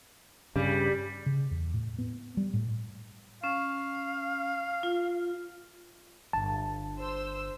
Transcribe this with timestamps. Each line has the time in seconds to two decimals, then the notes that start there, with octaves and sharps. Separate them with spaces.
0.56 G2 C#3 G3
1.26 C#3
1.51 E2
1.74 A2
1.98 B3
2.37 G3
2.54 A2
3.44 C#4 F5
4.83 F4
6.33 G1 A5
6.99 C5 E6